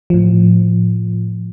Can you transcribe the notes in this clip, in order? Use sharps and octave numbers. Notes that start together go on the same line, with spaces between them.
A2 F3